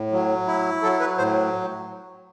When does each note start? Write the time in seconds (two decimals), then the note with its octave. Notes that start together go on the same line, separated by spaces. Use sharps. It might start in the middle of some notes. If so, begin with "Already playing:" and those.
Already playing: A2
0.12 F#3
0.47 E4
0.82 F#3 A4
1.00 B4
1.18 A2 C5